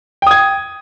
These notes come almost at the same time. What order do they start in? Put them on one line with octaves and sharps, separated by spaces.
G5 D#6 G#6